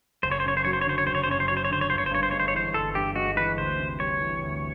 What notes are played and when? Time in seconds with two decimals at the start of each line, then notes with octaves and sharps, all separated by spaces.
0.23 F#1 C5
0.31 C#5
0.40 C5
0.44 F#2 C#5
0.57 C5
0.65 F#3 C#5
0.73 C5
0.81 C#5
0.86 D3 C5
0.98 C#5
1.07 F#1 C5
1.15 C#5
1.24 C5
1.28 F#2 C#5
1.40 C5
1.48 F#3 C#5
1.57 C5
1.65 C#5
1.70 D3 C5
1.81 C#5
1.90 G1 C5
1.98 C#5
2.06 C5
2.11 G2 C#5
2.23 C5
2.31 G#3 C#5
2.40 C5
2.48 C#5
2.54 E3 C5
2.74 G1 A4
2.95 G2 G4
3.15 G#3 F#4
3.36 E3 B4
3.57 D2 C5
3.79 C3
3.99 G3 C#5
4.21 E3
4.41 D2